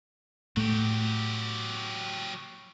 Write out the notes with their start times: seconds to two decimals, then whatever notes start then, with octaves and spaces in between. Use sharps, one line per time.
0.57 A2 F#3 A3 G4